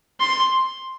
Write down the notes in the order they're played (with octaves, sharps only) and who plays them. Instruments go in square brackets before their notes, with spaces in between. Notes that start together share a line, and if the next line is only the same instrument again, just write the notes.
[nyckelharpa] C6